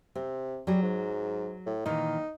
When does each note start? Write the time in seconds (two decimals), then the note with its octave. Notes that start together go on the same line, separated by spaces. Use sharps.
0.15 C3 C4
0.67 F#3 G3 G#4
0.82 G#2
1.66 A2
1.86 A#2 D#3 E3 D#4